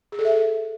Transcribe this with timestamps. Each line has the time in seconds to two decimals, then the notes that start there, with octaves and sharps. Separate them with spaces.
0.12 G#4
0.19 A4
0.25 E5
0.31 A4